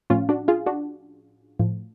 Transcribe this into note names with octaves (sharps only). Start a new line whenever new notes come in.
A2 F3 C#4 F4
D4 F#4
F4 G#4
D4 F#4
A2 F3